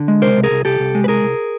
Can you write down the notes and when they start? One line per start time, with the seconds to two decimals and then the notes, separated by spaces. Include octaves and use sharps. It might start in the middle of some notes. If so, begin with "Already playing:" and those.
Already playing: D3
0.08 G#3
0.22 C2 A#4 C5
0.37 C2
0.44 G#4 A#4
0.51 C2
0.65 C2 G4 A4
0.80 C2
0.95 G#3
1.04 B4
1.08 C2 G#4 A#4
1.24 C2